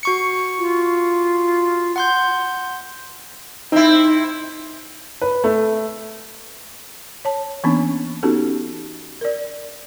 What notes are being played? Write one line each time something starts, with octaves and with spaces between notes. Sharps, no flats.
F#4 C#6 C#7
F4
F#5 C6 G6
C4 D#4 E4
B4
A3
C#5 A5
E3 A#3 B3 C#4 D4
B3 C#4 D#4 F#4 G4 A4
A#4 D5